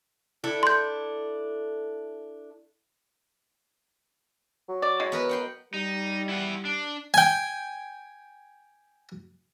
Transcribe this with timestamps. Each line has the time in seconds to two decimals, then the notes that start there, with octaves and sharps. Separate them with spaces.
0.44 D4 E4 A4
0.63 C6 G6
4.69 F#3
4.82 D5
5.00 G#3 E4
5.12 B3 A#4 B4
5.29 F#5 G5 C6
5.74 G3 D#4
6.29 E4 F#5
6.65 D4
7.14 G5 G#5